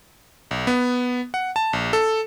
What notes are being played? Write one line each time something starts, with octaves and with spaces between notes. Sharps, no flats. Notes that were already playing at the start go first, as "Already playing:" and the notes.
B1
B3
F#5
A5
A#1
A4